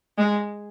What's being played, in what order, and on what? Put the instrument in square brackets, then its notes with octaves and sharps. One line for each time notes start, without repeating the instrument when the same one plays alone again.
[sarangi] G#3